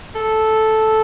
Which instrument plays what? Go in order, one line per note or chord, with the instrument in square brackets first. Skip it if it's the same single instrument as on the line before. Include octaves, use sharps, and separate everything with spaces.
[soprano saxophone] A4